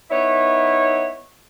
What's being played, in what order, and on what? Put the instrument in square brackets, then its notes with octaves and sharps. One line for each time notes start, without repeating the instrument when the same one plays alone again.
[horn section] B3 D#4 E4 C#5